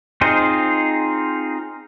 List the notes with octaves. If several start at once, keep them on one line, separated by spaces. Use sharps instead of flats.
C4 D#4 F4 G#4 C5